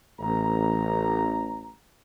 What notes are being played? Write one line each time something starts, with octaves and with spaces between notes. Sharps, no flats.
A1 A#5